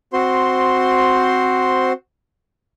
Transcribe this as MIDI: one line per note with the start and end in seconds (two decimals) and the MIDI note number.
0.13 1.93 60
0.13 1.93 66
0.13 1.93 72
0.13 1.93 84